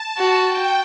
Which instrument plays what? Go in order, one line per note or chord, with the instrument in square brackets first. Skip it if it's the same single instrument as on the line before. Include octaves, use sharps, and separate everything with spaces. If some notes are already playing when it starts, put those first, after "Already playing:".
Already playing: [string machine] A5
[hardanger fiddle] F#4
[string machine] G5